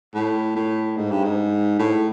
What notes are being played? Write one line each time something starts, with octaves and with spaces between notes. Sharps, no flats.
A2
A2
G#2
G2
G#2
A2